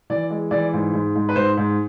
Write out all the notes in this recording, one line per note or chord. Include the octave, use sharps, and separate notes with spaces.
E3 D5
G#3
E3 D5
G#2
G#2
G#2
B4
G#2 C5
G#2